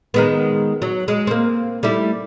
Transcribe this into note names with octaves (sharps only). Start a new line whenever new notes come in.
D#3 G#3 B3
F#3
G#3
A#3 C4
G3 A3 E4